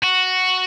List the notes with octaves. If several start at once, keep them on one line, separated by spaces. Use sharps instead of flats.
F#4